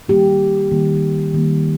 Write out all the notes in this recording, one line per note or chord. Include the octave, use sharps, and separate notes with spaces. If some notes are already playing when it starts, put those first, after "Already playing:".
D#3 G3 A#3 G4
D#3 G3 A#3
D#3 G3 A#3